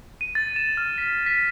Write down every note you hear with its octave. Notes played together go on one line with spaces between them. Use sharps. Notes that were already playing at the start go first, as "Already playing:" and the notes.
D#7
A6
E7
F6
B6
B6